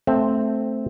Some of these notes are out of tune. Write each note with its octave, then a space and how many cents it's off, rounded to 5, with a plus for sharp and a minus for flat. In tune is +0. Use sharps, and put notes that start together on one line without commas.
A3 +0 C4 +0